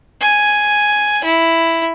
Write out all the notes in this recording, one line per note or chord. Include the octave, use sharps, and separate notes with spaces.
G#5
E4